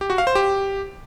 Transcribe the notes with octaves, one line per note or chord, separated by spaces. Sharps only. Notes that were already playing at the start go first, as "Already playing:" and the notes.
G4
F#4
F5
C5
G4